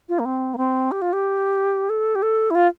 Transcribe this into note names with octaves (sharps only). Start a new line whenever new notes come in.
F4
A#3
C4
A#3
C4
G4
F4
G4
A4
G4
A4
E4
F4